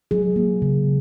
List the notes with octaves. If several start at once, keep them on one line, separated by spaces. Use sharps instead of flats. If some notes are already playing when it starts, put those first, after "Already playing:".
F#3 G#4
A#3
C#3